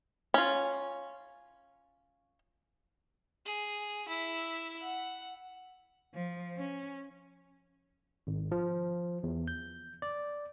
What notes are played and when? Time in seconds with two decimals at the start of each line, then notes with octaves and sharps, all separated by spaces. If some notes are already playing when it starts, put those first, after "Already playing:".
0.34 C#4 F4
3.46 G#4
4.08 E4 E5
4.82 F#5
6.15 F3
6.57 C#4
8.27 G#1
8.52 F3
9.23 E2
9.48 G6
10.02 D5